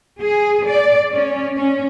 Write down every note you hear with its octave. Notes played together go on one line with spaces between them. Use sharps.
G#4
D5
C#4
C#4